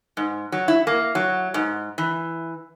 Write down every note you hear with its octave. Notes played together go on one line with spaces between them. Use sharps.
G#2
F#3
E4
A#3
F#3
G#2
E3